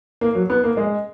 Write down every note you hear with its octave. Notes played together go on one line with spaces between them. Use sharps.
A#3
F#3
B3
A#3
G#3